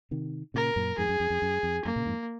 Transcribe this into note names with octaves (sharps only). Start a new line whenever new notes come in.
C3 D#3
A#2 C#3 A#4
F#2 A#2
F2 G#2 G#4
F#2
F2
F2
F#2
F2
F#2 A#3
A#2 C#3
F2 G#2